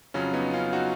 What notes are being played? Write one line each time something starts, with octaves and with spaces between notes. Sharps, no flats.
F2 C#3 F#3 C#4 F4
B3 D#4
C#4 F4
D#4 F#4